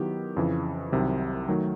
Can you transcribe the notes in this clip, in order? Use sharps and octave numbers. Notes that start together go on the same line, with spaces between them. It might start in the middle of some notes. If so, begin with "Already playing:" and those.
Already playing: D#3 F#3 B3 E4 G4
F2 C#3 E3
C2 C3 D#3 F#3
D#3 F#3 A3